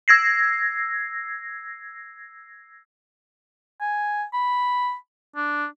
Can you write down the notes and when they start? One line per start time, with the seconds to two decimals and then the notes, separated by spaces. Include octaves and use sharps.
0.08 E6 G#6 A#6 C7
3.80 G#5
4.34 B5
5.36 D4